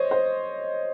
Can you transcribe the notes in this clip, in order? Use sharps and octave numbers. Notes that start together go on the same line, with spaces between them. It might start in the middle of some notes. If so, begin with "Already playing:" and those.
Already playing: C5 C#5 D#5
C5